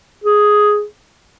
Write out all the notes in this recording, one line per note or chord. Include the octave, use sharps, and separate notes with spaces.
G#4